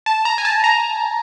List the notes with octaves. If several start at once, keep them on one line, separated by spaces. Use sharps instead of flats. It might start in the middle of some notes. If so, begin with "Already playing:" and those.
A5
A#5
G#5
A5
A#5